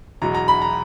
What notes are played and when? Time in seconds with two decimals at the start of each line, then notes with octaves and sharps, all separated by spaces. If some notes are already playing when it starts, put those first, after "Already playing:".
0.22 E2 B2 F#3 A#5
0.35 A#5
0.48 B5
0.62 A#5